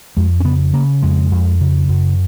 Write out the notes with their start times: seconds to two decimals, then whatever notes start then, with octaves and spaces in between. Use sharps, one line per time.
0.17 F2 G#3
0.40 C#4
0.44 C#3 B3
0.73 C#3 A#3
1.02 F2 G#3
1.31 F2
1.61 C#3
1.89 F#2